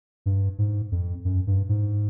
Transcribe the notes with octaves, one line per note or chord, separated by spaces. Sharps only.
G2
G#2
F2
F#2
G2
G#2